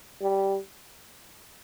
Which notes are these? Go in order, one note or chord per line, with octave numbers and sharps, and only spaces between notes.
G3